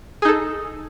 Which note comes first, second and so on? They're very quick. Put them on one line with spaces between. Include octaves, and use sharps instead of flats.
G#4 D#4 A4